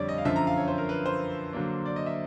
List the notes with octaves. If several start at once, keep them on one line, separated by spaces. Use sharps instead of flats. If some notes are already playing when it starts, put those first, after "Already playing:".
Already playing: F2 D3 G3 C#5 D5
D#5
F5
F#2 D3 F3 E5
A#5
F5
C#5
C5
A#4
B4
C5
D3 F#3 A#3 D4
D5
D#5
E5